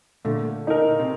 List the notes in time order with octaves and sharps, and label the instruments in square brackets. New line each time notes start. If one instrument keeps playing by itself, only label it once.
[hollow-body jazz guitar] A#2 D3 [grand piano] A3
[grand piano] D#4 A#4
[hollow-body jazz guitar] C3